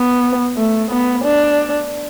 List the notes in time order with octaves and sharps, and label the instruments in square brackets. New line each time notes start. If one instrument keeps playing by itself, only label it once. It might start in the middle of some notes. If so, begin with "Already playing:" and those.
Already playing: [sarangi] B3
A3
B3
D4